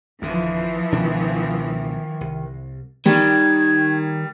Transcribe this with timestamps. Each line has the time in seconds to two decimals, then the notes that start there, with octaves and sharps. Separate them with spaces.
0.22 G#1 F2 D3 E3 F3
0.92 C#2 B2 D#3 D4
2.21 C2
3.06 D#3 G3 G#6